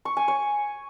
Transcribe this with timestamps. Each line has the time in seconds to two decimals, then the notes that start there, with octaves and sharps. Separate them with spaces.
0.05 C#6
0.17 G#5
0.28 C#5